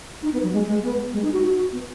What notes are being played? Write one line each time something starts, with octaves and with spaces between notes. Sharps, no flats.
D#4
B3
F#3
G#3
G#3
B3
G#3
D#4
F#4
F#4
B3